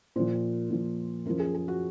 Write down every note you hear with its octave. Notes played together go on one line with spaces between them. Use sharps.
A#2 F3 C5
A#2 F3
F#2 F3 A#4
G#4
G#4
F#4